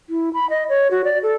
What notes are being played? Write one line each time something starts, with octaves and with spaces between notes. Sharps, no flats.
E4
B5
D#5
C#5
F#4
D5
A4